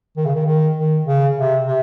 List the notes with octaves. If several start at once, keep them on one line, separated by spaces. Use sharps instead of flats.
D#3
C#3
D#3
D#3
D#3
C#3
C3
C3